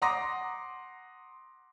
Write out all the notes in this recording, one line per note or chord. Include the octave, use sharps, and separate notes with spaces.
F#5 A#5 C6 D6 D#6 A#6